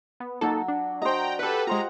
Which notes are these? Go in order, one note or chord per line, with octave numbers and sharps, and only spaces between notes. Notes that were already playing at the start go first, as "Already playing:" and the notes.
B3
F#3 A#3 D#4 F#4 A4
D4
F#4 C5 D#5 G5 A#5
G4 A4 B4 F#5
G#3 F4 C5 D#5 A#5